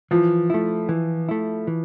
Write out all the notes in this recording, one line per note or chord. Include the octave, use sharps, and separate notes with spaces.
E3 F3
A3 E4
E3
A3 E4
E3